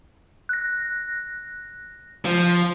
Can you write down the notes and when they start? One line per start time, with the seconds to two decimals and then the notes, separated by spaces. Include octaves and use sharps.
0.49 F#6 A#6
2.25 F3